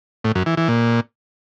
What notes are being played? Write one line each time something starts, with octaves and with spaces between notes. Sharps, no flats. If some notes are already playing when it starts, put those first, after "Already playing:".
A2
F#2
E3
E3
A#2